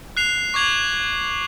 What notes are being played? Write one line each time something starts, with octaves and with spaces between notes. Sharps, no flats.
F#6 C7 F7
C#6 D6 G#6 F7 F#7